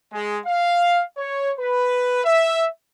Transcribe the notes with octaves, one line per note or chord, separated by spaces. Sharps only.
G#3
F5
C#5
B4
E5